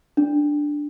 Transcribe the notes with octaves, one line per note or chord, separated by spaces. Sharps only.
D4